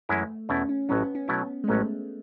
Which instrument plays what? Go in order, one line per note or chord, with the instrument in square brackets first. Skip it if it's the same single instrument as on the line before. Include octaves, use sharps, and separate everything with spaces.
[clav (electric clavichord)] F#2 E3 G#3 C#4 E4 [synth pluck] A3
[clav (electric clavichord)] E2 B2 A3 E4 [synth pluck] C#4
[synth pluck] C#4
[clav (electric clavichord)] A1 A2 F#3 [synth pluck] C#4
[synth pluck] B3
C#4
[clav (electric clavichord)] B2 F#3 A3 C#4 E4 [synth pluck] B3
[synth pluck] G#3
[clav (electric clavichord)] A1 A2 F#3 C#4 [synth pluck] A3